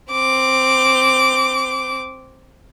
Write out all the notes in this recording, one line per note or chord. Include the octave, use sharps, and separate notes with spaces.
C4 D6